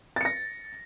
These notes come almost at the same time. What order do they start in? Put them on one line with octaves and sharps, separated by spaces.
A6 C#7 A#6